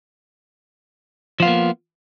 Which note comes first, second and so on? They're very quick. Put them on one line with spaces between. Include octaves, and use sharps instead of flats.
F3 F4 B3 A#3